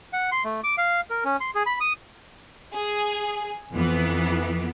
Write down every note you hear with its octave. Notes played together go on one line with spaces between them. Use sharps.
F#5
C6
A3
D6
F5
A#4
C#4
C6
G#4
B5
D#6
G#4
F2 E3 B3